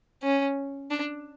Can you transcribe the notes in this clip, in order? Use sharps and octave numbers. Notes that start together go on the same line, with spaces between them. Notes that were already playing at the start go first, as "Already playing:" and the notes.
C#4
D4